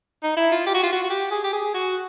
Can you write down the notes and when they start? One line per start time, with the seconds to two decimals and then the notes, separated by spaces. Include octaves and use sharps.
0.23 D#4
0.37 E4
0.52 F4
0.66 G4
0.74 F#4
0.83 F4
0.92 F#4
1.03 F#4
1.10 G4
1.31 G#4
1.44 G4
1.53 G#4
1.74 F#4